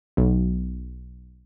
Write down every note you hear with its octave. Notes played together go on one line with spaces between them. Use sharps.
B1